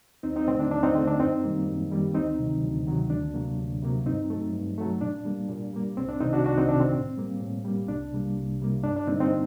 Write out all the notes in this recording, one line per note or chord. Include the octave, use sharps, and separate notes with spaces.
D#2 C4 D#4
C4 D#4
D3 A3 C4
D4
D#2 D4
C4 D#4
D3 A3 C4
D4
F#2 C4 D#4
D#3 G3 A#3
F#2
D#3 G3 A#3
D2 C4 D#4
C3 D#3 F#3
D2
C3 D#3 F#3
D2 D4
C3 F#3 A#3
D2
C3 F#3 A#3
G2 C4 D#4
F#3 A3
G2
F#3 A3
A#2 D4
G3 A#3
A#2
G3 A#3
C2 C4
D4
C3 D#3 C4 D#4
D4 F#4
C2 D4 F#4
C4 D#4
C3 D#3 D4
C4
A2
G3 A#3
A2
G3 A#3
C2 D4
C3 G3 A#3
C2
C3 G3 A#3
G2 D4
D4
D3 G3 A#3 C4 D#4
C4 D#4